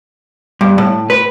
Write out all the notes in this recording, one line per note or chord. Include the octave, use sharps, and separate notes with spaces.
G2
A2
B4